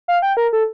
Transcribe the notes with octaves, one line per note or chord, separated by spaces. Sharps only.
F5
G5
A#4
A4